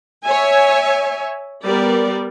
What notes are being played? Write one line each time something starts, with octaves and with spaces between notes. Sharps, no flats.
C#5 E5 G#5
G3 B3 A#4 D5